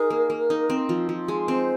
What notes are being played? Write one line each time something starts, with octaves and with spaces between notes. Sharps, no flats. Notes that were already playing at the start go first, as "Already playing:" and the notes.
Already playing: D#4 G#4 A#4
A#3
A#3
D#4
C4
F3
F3
G#3
C4 C5